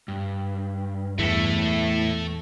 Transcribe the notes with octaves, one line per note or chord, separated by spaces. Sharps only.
G2
E2 A2 A3 E4